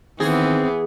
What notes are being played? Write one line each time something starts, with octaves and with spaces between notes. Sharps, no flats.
D#3 E3 B3 C4 G#4